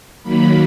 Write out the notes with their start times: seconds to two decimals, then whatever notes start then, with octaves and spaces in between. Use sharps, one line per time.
0.23 D#3 F#3 A#3 B5